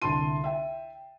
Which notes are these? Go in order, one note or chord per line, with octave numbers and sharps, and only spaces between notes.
C2 D3 A5 C6 D#7
E5 G5